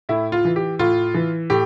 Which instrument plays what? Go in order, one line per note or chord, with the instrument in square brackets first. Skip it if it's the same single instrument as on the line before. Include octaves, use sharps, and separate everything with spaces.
[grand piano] A2 E4
F4
E3
G4
A2 F4
E3
A2 G4